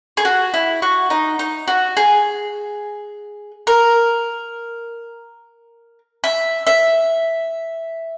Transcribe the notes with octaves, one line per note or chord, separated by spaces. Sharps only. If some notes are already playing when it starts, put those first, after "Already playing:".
G#4
F#4
E4
F#4
D#4
D#4
F#4
G#4
A#4
E5
E5